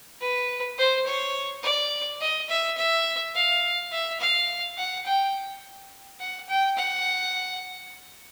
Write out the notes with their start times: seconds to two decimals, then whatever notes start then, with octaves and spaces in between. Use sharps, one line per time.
0.21 B4
0.78 C5
1.06 C#5
1.63 D5
2.20 D#5
2.49 E5
2.77 E5
3.34 F5
3.92 E5
4.20 F5
4.77 F#5
5.05 G5
6.19 F#5
6.48 G5
6.77 F#5